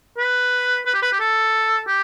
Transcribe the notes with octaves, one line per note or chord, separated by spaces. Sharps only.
B4
B4
G4
B4
G4
A4
G4